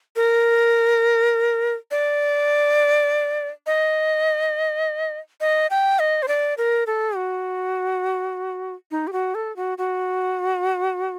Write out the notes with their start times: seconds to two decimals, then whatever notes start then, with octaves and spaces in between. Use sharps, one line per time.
0.16 A#4
1.91 D5
3.67 D#5
5.40 D#5
5.70 G5
5.99 D#5
6.23 C5
6.28 D5
6.58 A#4
6.87 A4
7.16 F#4
8.91 D#4
9.07 G4
9.13 F#4
9.35 A4
9.56 F#4
9.78 F#4